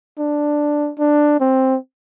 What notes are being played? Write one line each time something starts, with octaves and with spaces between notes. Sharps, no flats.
D4
D4
C4